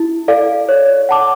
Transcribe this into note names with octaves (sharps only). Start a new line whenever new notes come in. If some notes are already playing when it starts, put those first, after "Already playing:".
Already playing: E4
A4 D5 F5
C#5
F#5 A5 D6